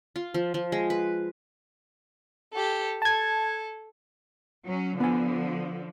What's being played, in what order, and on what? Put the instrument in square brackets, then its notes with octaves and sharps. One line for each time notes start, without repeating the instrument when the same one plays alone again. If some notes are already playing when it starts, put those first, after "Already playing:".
[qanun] F4
F3
F3
G#3
B4
[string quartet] G4 A4
[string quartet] A4 [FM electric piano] A5 G#6
[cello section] F#3 C#4
[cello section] D3 F3 [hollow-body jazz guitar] B3 G#5